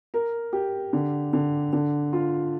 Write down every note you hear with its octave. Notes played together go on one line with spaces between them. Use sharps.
A#4
G4
D3
D3
D3
F4